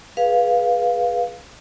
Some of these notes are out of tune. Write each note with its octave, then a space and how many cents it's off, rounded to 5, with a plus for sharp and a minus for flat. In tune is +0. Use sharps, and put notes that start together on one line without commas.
G#4 +10 B4 -15 F5 +0